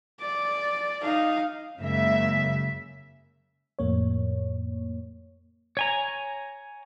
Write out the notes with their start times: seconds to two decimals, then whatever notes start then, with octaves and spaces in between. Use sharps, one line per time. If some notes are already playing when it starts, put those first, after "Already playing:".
0.21 D5
1.02 D#4 F5
1.80 F#2 C#3 F#3 G#3 A#3 E5
3.79 F2 A2 A#3 C#5
5.77 C#5 G#5 A#5